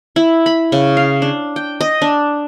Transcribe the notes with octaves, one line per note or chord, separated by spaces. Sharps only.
E4
B5
C#3
F5
D4
G5
D#5
D4